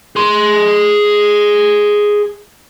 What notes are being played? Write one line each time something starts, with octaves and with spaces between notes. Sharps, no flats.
G#4 C6